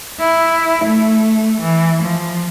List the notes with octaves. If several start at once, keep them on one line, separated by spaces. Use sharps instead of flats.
E4
A3
E3
F3